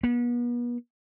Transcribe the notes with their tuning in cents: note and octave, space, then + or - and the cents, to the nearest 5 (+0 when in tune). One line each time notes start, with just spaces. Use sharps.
B3 -40